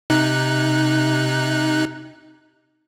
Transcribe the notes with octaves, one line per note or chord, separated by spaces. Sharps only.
C3 D#4 F#6